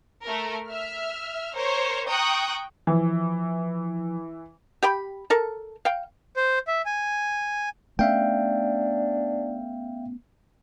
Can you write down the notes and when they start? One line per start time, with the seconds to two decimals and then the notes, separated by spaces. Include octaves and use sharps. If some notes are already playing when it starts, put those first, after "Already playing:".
0.23 A3 A#4
0.68 E5 F6
1.55 A#4 C5 C#5
2.08 G5 A#5 C#6 D#6 F#6
2.87 E3 F3
4.83 G4 G5 B5
5.30 A4 A#4
5.85 F5 G5
6.36 C5
6.67 E5
6.86 G#5
7.99 A3 B3 C#4 D4 E5 F5 G5